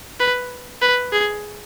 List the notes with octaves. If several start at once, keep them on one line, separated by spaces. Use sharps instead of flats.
B4
B4
G#4